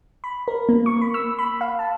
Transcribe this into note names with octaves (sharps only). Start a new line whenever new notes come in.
B5
A#4
A#3
C#6
B5
E6
B5
F5
A5